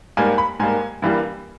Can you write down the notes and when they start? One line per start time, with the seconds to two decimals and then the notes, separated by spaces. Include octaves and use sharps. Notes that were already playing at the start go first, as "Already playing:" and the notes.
0.17 G#2 G3 A#3 G#5
0.38 B5
0.60 G#2 G3 A#3 G#5
1.02 G2 E3 G3 A#3